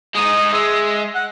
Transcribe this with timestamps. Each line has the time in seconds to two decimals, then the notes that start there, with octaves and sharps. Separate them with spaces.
0.15 G#3 D#4 D#6
0.52 G#3 E5
1.15 F#5